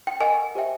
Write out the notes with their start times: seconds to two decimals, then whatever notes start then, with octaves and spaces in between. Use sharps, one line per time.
0.07 G5
0.20 A#4 D#5 F#5 G#5
0.55 G4 C5 E5 G5